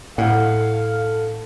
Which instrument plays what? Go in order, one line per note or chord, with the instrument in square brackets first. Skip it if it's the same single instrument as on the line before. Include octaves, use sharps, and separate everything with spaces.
[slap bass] A2 [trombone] A4 [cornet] F5 [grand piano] F#5